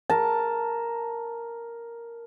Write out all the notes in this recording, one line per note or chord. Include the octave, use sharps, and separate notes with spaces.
A#4 A5